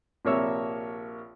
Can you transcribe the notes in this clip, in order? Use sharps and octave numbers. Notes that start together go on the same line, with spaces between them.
A#1 C3 A#3 C#5 E5 E6